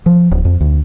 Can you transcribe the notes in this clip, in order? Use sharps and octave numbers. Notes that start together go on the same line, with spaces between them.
F3
D1
F2
D2